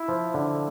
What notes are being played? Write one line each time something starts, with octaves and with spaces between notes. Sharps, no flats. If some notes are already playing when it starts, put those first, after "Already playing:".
Already playing: E4 E5
F3
D3